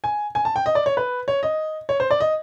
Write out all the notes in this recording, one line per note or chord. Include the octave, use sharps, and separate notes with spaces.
G#5
G#5
A5
G5
D#5
D5
C#5
B4
C#5
D#5
C#5
C5
D5
D#5